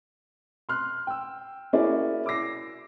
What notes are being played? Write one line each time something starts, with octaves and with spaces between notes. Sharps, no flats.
C6 F6 F#6
G5 E6
A#3 C#4 E4 F#4 G#4 D5
D6 E6 A#6 C7